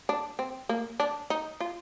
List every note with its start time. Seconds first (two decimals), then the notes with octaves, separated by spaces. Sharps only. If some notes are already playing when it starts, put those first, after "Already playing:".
0.09 D4
0.39 C4
0.69 A#3
1.00 D4
1.30 D#4
1.60 F4